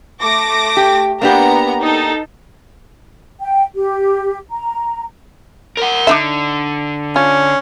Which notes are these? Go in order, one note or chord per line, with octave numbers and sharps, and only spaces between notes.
A3 D6 A#6
G4
A#3 B3 D4 G4 A#5
D#4 A4
G5
G4
A#5
A#4 F#5
D3 D4 D#4 E5
C#4 F4